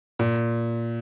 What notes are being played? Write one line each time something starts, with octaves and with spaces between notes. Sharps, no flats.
A#2